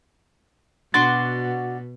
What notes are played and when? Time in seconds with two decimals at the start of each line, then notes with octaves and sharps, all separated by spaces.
0.94 B2 D4 F#4 C6 A6